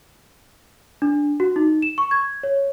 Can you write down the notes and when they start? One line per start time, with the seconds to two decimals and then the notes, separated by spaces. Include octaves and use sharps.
1.02 D4
1.40 F#4
1.56 D#4
1.82 E7
1.98 C#6
2.11 G#6
2.43 C#5